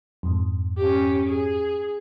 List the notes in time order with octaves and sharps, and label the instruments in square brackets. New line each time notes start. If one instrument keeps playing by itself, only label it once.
[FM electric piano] F2 G#2
[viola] C#4 G4
G#4